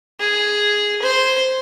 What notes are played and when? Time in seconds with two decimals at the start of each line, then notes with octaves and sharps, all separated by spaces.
0.20 G#4
1.02 C5